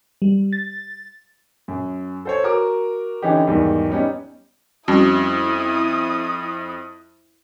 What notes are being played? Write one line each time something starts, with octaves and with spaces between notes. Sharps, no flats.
G3
A6
F#2
A4 C5 C#5
F#4 A#4 D6
D3 E3 C#4 D#4 G4
E2 G#2 D#3 G3
G3 B3 C#4 D#4
F2 G3 C#4 E4 F#4 D#6